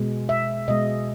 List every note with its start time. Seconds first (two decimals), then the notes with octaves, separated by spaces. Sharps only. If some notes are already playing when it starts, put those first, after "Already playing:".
Already playing: B2 G#3
0.29 E5
0.68 B2 G#3 D#5